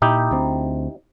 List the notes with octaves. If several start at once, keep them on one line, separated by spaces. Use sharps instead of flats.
A#2 D#4 E4 G4
D2 C4